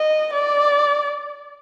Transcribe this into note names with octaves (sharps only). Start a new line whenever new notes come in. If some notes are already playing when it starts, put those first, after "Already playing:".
Already playing: D#5
D5